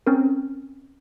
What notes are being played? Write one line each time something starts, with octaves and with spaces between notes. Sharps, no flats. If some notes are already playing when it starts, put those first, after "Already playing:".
C4 C#4 A#4